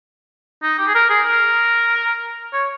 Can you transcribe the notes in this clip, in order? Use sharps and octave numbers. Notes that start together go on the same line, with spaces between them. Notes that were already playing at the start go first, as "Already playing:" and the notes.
D#4
G4
G#4
A#4
G#4
A#4
C#5